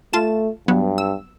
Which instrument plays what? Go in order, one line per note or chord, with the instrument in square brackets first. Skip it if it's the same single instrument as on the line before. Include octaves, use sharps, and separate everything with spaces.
[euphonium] A3 [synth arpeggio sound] F4 A5 E7
[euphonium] G2 [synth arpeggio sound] F#3 B3
[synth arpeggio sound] E6